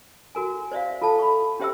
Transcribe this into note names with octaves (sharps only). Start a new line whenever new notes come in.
F#4 A#4 G#5
C5 D5 E5 F5
F4 A4 F5 A5
B5 C#6
C#4 G4 C5 E5 G5 E6